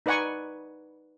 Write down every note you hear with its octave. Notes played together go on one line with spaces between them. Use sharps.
D#4 B4 D5 F#5 G#5 C#6